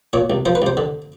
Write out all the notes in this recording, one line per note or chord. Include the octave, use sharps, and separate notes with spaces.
A#2 C#5
C2
F3 C5
B4
C2 C5
D3